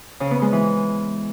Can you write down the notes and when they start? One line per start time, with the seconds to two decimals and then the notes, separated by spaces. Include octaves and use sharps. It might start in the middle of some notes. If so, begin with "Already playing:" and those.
0.20 C#3
0.31 B3
0.42 G#3
0.52 E3